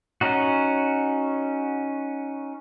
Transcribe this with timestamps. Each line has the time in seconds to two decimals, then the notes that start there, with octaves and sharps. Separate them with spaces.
0.21 C#4 D#4 F#4